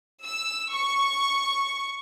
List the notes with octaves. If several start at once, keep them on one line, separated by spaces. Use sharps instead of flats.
E6
C#6